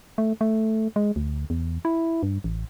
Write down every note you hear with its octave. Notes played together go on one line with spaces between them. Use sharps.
A3
A3
G#3
D2
E2
E4
G2
A1